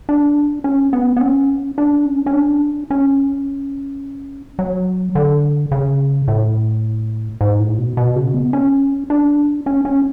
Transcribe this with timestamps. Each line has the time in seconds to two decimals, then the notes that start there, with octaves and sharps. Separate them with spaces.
0.09 D4
0.64 C#4
0.93 B3
1.17 B3
1.21 C#4
1.78 D4
2.05 C#4
2.26 C#4
2.33 D4
2.90 C#4
4.59 F#3
5.15 D3
5.71 C#3
6.28 A2
7.41 G#2
7.60 A2
7.78 B2
7.97 B2
8.16 C#3
8.34 B3
8.53 C#4
9.10 D4
9.66 C#4
9.85 C#4